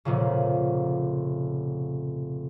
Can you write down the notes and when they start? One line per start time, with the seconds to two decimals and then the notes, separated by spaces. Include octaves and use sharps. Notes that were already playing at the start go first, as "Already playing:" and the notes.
0.05 F1 A#2 C#3